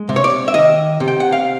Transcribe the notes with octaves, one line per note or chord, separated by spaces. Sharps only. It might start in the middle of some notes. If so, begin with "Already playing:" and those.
Already playing: G#3
C3
C#5
D5
E5
D#3 D#5
C3
G5
F#5
F5